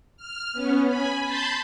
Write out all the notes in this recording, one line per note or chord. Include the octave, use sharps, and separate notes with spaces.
F6
B3 C#4
G#5 B5
A5 B5 C6 G6 A6